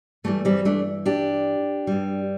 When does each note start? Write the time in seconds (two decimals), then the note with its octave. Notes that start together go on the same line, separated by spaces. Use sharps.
0.24 G2 E3 G3 A3
0.45 G3 C4
0.65 A3 D4
1.06 D4 G4
1.87 G2 G3